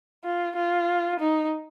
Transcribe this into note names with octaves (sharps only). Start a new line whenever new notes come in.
F4
F4
D#4